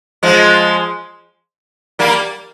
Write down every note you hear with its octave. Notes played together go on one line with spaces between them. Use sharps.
F3 G#3
G3 A#3